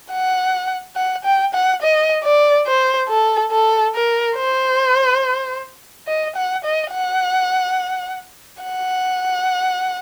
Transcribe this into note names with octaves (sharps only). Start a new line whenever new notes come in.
F#5
F#5
G5
F#5
D#5
D5
C5
A4
A4
A#4
C5
D#5
F#5
D#5
F#5
F#5